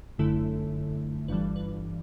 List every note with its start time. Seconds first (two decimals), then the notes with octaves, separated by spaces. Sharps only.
0.18 G1 F#2 D3 A3 E4 A4
1.28 G1 G2 E3 G3 B4
1.56 B4